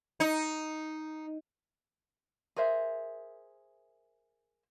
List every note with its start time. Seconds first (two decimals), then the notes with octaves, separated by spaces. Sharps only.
0.20 D#4
2.56 G#4 A#4 C5 E5